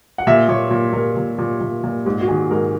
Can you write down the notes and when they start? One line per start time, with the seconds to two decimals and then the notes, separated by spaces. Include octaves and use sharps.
0.18 F#5
0.27 A#2 E5
0.48 A#2 C#5
0.71 A#2 A#4
0.93 A#2 A#4
1.17 A#2
1.38 A#2
1.61 A#2
1.84 A#2
2.05 G#2 G#4
2.21 F#4
2.28 D#3 G#4
2.51 G#2 A#4